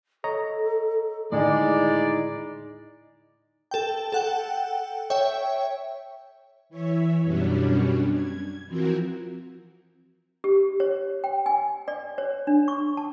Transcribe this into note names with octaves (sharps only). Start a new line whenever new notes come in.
A4 C#5 D#5 A#5
D#2 A2 D3 G#3 D#4 E4 D5 D#5
A4 G5
A4 F#5 G5
C#5 E5 G5
E3 C#5 E5
F#2 B2 F#3 G3 C#4 D4
G#6
E3 F3 C4 F#4 A#4
G4
C#5
G5
G#5
D5
C#5
D4
C#6
A5